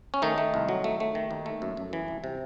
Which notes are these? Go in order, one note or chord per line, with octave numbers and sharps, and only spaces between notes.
C#4
D#3 A3 D#4
A3
C2
F#3
A3
A3
D#3
D#2
A3
F#2
F#2
E3
C2
C3